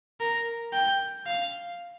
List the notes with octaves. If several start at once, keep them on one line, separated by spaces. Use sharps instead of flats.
A#4
G5
F5